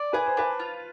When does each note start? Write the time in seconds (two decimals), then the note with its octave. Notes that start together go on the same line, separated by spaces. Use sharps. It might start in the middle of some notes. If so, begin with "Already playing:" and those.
Already playing: D5
0.13 G#4 B4
0.26 C5
0.37 D4 B4
0.59 F4